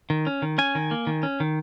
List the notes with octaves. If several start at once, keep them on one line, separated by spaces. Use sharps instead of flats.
D#3
C#4
D#3
C#4 G#5
D#3
A#3
D#3
C#4
D#3